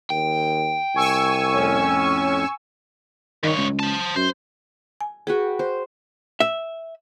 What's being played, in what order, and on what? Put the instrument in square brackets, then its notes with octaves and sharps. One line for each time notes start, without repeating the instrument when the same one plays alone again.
[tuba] D#2 [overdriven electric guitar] G5
[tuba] C2 [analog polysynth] G#5 C#6 E6
[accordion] F2 A2 C#4
[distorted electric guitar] G2 C#5 [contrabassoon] D#3
[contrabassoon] C#2
[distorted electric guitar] C5 A5
[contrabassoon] F#2 [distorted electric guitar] C5
[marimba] G#5
[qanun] F#4 B4 G5 [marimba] G#4
[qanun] C5
[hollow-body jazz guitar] E5